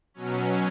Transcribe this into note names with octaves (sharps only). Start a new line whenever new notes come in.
B2 F#3 C#4